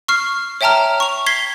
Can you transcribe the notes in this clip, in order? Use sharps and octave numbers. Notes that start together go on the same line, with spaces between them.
C#6 F6 C7
C#5 E5 G5 A5 A#5 F6
C#6 F7
G#6 B6 C7 G7